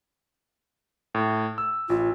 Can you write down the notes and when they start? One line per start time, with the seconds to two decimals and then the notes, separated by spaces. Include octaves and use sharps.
1.15 A2
1.58 E6
1.90 A1 F4